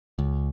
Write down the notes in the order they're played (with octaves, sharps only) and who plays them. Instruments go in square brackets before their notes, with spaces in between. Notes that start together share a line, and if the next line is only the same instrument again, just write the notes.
[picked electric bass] C#2